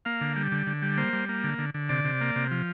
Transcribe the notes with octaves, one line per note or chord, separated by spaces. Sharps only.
A#3 F5
D3
G3
D3
D3
G3
A#3 C5
G3
A#3
D3
D3
D3
C3 D5
C3
A#3
C3
F3